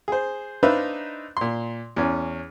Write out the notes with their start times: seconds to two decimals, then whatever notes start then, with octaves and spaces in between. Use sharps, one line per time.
0.08 G#4 C5
0.63 D4 D#4 B4 C5 E5 F5
1.37 A#2 C6
1.96 E2 C#4